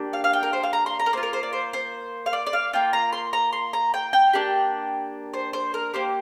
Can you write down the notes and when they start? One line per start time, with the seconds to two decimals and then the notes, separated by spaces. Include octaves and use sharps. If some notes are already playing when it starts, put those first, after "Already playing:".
Already playing: A#3 D4 G4
0.13 F5
0.24 F5
0.33 G5
0.43 A#4
0.53 C5
0.63 F5
0.73 A#5
0.86 C6
0.99 A#5
1.06 A#4
1.13 A#3 F4 C5
1.23 A#4
1.33 C5
1.43 D5
1.53 C5
1.73 C5
2.26 F5
2.33 D5
2.46 D5
2.53 F5
2.73 A#3 F4 G5
2.93 A#5
3.13 C6
3.33 A#5
3.53 C6
3.73 A#5
3.94 G5
4.13 G5
4.33 A#3 D4 G4
5.34 C5
5.53 C5
5.74 A#4
5.94 A#3 G4 C5